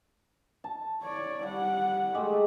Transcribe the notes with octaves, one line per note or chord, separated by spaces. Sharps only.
A5
C#5 D5
G3 F#5
G#3 A3 G4